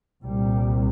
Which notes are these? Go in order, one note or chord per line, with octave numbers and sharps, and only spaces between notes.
C2 A#2 G3